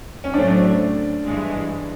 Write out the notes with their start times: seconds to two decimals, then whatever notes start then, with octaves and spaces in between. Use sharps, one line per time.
0.24 C#4
0.34 A2 F#3 A3 C4 D4
1.26 G2 E3 G#3